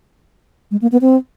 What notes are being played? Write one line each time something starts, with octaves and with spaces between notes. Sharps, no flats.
G#3
A#3
B3
C4